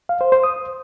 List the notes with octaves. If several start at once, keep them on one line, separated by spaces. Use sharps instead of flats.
F5
C5
C5
D#6